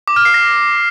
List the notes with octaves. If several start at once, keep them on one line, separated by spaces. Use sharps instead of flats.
D6
F6
C7
A#6